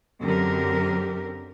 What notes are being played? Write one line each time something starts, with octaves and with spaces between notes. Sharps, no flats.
F#2 D3 C4 G4 A#4